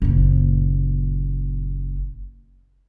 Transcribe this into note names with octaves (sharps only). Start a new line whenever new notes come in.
F#1 A#2